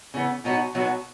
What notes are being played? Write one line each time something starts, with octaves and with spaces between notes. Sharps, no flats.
C#3 E3 B3
B2 F#3 B3 D#4 F#4
B2 F#3 B3 D#4 F#4